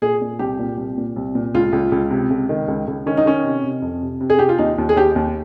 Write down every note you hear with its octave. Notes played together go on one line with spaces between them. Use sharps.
A#2 G#4
A#2
C2 G4
A#2
C2
A#2
C2
A#2
C#2 F4
C#2
C#2
C3
C#2
D#3
C#2
C#2
D#3 C#4
D#4
D#3 C#4
C3
C3
F2
C3
C3
G#4
C3 G4
F4
D#2 D#4
D#2
G#4
D#2 G4
D#2